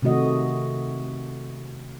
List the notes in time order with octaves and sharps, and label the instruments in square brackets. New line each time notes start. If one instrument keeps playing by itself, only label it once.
[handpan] C3 D#3 A3 F#4 D#5